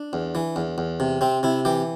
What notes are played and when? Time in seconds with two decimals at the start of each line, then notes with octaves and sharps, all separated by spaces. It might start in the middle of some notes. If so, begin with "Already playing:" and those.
Already playing: D4
0.13 E2
0.35 E3
0.56 E2
0.78 E2
1.00 C3
1.21 C3 C4
1.43 C3 E4
1.65 E3 G4